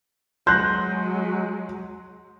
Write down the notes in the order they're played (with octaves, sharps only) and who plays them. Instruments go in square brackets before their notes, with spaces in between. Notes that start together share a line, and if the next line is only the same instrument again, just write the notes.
[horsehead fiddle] F#3 G#3 [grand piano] C6 A#6 [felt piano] F#6 G6